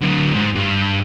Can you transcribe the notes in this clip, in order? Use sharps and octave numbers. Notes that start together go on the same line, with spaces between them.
D3 F#3
G#2
G2